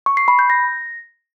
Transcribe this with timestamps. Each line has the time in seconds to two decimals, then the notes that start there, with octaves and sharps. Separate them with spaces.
0.06 C#6
0.17 C7
0.28 B5
0.39 G6
0.50 A#6